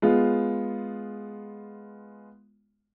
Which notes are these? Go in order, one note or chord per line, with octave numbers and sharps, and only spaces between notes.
G#3 B3 F4